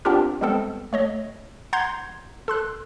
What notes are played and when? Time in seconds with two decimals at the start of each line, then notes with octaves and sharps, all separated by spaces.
0.05 B3 C4 D4 F4 G4 A#4
0.41 G3 G#3 B3 C4 A4
0.93 A3 C#5 D#5
1.73 F#5 A#5 C6 G6 G#6
2.48 A4 C6 F#6